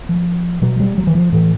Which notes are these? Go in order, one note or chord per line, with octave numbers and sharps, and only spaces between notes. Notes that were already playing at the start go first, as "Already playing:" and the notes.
F3
B2 F#3
G3
F#3
E3
F3
A2 E3